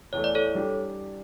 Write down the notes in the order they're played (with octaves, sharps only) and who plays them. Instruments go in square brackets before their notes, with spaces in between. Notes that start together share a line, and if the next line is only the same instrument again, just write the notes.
[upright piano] E2 E3 A3 [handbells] C#5
[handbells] D5
A4 C#5
[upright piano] G3 D4 G4